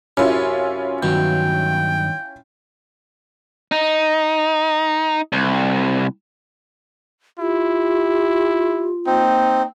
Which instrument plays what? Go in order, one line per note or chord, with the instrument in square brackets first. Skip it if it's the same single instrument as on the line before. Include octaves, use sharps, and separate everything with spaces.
[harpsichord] F#2 C3 [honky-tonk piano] C#4 E4 F4
[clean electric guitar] G2 D#3 F#3 [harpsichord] B2 [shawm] G5
[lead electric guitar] D#4
C2
[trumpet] E4 [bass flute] F4 [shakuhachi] G4
[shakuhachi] A#3 [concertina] C4 [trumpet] D#4